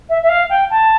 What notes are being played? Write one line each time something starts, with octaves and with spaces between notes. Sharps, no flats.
E5
E5
F5
G5
A5